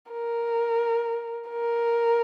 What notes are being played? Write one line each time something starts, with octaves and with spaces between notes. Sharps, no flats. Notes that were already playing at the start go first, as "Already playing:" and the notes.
A#4
A#4